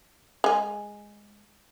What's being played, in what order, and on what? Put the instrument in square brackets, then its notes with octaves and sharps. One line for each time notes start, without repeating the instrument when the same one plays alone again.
[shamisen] G#3 G#5